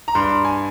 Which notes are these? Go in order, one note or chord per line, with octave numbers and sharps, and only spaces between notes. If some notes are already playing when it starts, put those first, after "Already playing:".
A#5
G2 C6
G#5